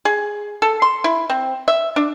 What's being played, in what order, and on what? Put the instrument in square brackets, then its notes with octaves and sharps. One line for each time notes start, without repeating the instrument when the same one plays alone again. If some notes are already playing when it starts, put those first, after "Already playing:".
[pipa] G#4
A4
C6
E4
C4
E5
D4